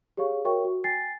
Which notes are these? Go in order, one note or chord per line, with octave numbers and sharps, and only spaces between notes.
G4 G#4 C#5 F5 C#6
F#4 A#4 C#5 E5 G5 C#6
F#4
G5 G#5 A6 C7